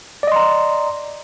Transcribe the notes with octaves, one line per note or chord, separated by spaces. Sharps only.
D5 D#5 A#5 C6